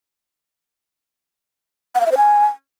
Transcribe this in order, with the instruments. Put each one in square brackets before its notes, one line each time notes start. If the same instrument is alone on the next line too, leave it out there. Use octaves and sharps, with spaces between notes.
[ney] F#5
F5
E5
C5
G#5